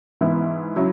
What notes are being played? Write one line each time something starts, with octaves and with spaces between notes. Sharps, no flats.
G#2 E3 B3 E4
C#3 F#3 E4